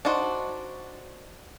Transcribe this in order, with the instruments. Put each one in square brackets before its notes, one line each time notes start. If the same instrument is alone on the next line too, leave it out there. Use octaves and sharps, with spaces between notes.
[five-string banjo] D4 D#4 F#4 C5